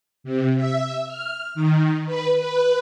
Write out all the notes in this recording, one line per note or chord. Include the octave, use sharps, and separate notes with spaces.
C3
E5
F6
D#3
B4
B4